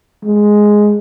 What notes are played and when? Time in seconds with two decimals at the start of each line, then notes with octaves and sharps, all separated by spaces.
0.24 G#3